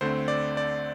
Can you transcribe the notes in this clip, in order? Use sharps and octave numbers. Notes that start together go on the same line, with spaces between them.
D2 D3 A3 C4 C5
D5
D5